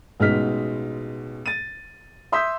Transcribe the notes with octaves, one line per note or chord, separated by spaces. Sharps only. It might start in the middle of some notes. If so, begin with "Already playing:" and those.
A1 B2 G#3 D#4 F6 B6
A6 D#7
E5 C6 D#6 E6 G6 B6